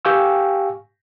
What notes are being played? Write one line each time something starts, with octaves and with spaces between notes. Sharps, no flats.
G4 F5 G5 G#5 C#6 E6